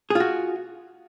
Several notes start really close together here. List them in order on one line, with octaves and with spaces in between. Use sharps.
G#4 F4 F#4